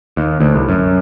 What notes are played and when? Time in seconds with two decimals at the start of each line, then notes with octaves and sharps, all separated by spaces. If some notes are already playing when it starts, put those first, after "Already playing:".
0.17 D#2
0.40 D2
0.54 C2
0.69 F#2